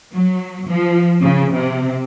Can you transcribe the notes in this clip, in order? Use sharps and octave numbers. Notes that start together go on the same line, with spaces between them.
F#3
F3
C#3
C3